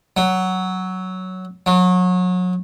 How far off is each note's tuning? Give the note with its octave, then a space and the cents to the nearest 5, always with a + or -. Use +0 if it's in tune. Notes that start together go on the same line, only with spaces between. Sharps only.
F#3 +5
F#3 -30